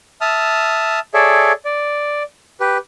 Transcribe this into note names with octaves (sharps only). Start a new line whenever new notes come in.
E5 A5 D#6 F6
G#4 A4 C#5 D5 E5
D5
G4 B4